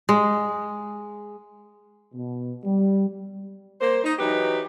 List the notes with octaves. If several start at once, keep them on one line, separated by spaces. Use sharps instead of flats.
G#3
B2
G3
A#3 C5
D#4
E3 F#3 D#4 G4 B4